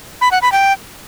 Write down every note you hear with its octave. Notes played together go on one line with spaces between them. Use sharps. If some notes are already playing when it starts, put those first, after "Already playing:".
B5
F#5
B5
G5